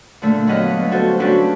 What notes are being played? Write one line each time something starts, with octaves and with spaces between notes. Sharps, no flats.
A#2 D3 A3
F#3 G3 B3 B4 D#5 F5
D3 B3
F#4 A4 C5
C#4 D4 F#4 G4 A4 B4